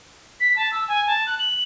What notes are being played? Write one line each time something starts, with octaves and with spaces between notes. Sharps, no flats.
B6
A5
E6
G#5
A5
F#6
F#7